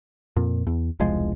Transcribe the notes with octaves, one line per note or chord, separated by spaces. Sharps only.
F2 A#2
E2
E1 C2 F3 G#3